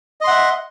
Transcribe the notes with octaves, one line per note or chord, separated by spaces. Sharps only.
D#5 E5 F#5 C6